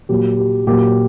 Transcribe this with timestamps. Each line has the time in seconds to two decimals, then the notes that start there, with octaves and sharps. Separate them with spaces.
0.09 A#2 F#3 G4
0.38 G4
0.67 A#2 F#3 G4